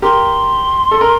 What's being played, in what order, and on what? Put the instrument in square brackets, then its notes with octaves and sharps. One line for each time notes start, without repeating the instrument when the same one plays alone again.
[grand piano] G4 A#4 [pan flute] C6
[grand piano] A4
A#4